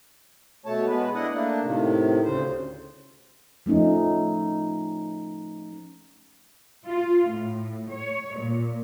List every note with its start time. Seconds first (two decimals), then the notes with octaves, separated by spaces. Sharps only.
0.66 B2 A3 C#5 A5
0.87 G#3 B3 B4
1.14 D4 E4 D#5 F#5
1.32 A3 A#3 D4
1.62 A2 C3 D#3
2.24 D2 C#3 C5
3.66 F3 A3 C#4 D#4
6.86 F4
7.30 A2
7.91 C#5
8.38 A#2